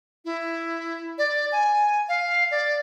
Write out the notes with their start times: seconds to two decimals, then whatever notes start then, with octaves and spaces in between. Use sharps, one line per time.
0.25 E4
1.18 D5
1.52 G#5
2.09 F5
2.51 D5